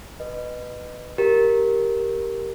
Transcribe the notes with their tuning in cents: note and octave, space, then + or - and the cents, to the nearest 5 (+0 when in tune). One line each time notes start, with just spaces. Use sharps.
B4 +5 D#5 -20
G4 +0 A#4 +0